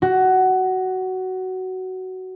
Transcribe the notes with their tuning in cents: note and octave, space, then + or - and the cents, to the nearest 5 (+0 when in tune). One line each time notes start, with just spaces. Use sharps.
F#4 +15